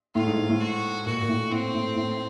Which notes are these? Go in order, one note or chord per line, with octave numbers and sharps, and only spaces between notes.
A2 F4
G#2
G#2
A2
F#4
A#2 F#4
A#2
A2
A2 C4
A2
A2